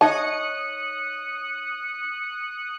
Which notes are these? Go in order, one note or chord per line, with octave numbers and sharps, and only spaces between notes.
D#4 C#5 D#5 A5 D#6 F#6 C#7